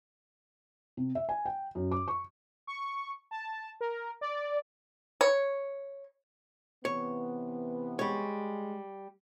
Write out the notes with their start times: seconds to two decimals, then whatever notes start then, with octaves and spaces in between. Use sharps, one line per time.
0.97 C3
1.15 E5
1.29 G#5
1.46 G5
1.75 F#2
1.91 D6
2.08 C#6
2.67 C#6
3.31 A5
3.81 A#4
4.21 D5
5.21 C#5
6.85 C3 E3 B3 C#5
7.99 G3 G#3 C#5